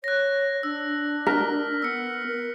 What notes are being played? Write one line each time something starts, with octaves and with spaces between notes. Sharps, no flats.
C#5 F#6 A#6
D4 E6
A#4 F6 B6
B3 E6 C#7
A#4